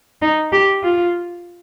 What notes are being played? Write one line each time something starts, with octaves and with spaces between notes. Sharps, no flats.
D#4
G4
F4